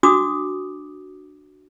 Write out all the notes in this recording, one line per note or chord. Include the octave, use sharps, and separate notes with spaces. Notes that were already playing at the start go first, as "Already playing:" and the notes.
D4 F#4 D6 D#6